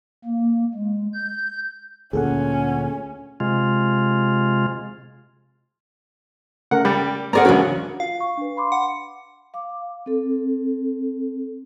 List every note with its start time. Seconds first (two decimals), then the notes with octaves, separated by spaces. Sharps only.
0.25 A#3
0.74 G#3
1.14 G6
2.13 D2 A#2 C#4 G#4 A4 F#5
3.40 C3 G#3 F4
6.71 C#3 A3 A#4 F#5
6.85 G3 G4 D5
7.33 A#3 C4 G#4 A#4 D5 F#5 A#5
7.45 C#2 E3 F#3 C#4 D4 F#4
8.00 F4 F5
8.20 C#6
8.37 D4 B4
8.57 B5 C6 D6
8.72 F#5
9.54 F5 D6
10.06 C4 A4